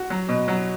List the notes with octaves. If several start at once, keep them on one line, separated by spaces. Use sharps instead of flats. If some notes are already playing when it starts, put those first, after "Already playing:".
Already playing: F#4
F#3
B2
F#3